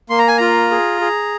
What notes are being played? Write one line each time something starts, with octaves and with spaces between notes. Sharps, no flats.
A#3 C6
A#5
G#5
F4 A#5
G#4
G#4